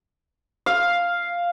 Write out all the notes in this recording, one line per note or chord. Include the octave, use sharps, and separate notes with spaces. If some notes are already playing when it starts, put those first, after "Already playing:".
F5